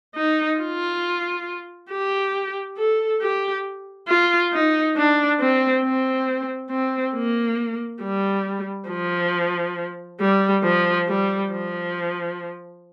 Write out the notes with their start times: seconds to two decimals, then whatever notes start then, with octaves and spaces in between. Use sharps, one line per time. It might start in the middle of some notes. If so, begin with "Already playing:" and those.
0.15 D#4
0.59 F4
1.90 G4
2.77 A4
3.21 G4
4.08 F4
4.53 D#4
4.96 D4
5.40 C4
5.84 C4
6.71 C4
7.15 A#3
8.01 G3
8.90 F3
10.21 G3
10.63 F3
11.08 G3
11.52 F3